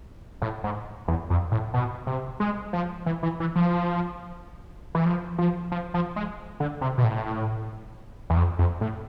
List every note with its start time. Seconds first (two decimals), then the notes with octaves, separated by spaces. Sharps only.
0.42 A2
0.64 G#2
1.08 E2
1.30 F2
1.51 A2
1.74 B2
2.07 C3
2.40 G#3
2.73 F3
3.06 E3
3.23 E3
3.40 E3
3.55 F3
4.95 E3
5.05 F3
5.38 F3
5.72 F3
5.94 F3
6.16 G#3
6.60 D3
6.81 C3
6.98 B2
7.04 A2
8.30 E2
8.36 F2
8.59 F2
8.81 A2